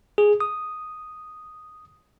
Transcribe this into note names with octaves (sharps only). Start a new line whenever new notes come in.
G#4
D#6